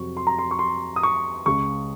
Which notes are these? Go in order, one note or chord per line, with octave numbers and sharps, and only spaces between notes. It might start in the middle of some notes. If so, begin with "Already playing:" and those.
Already playing: F2 C3 F#3 C4 C#6
C6
A#5
C6
C#6
C6
D#6
C#6
C#2 C#3 G#3 C#6